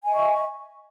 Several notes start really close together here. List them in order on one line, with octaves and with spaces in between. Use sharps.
G#5 D#5 E5 C#6